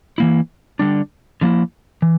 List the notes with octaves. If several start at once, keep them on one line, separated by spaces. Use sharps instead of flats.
E3 A#3 E4
D3 G3 D4
D3 F3 A#3 E4
E3